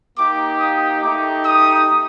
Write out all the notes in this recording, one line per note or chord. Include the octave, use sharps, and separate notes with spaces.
A#3 D#4 G4 D6
D#6
A3 D#4 G4 D6
D#6